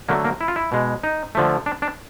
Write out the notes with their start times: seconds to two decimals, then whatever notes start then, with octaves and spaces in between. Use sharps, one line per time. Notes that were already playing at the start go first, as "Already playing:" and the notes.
0.09 D3 F#3 A3 A#3
0.25 A#3
0.41 E4
0.48 F4
0.56 E4
0.72 B2 G#3
1.03 D#4
1.35 D3 F3 A3
1.66 D4
1.82 D4